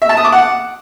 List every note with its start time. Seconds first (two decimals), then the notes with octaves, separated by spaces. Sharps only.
0.02 E5
0.09 A5
0.17 D#6
0.25 D6
0.32 F#5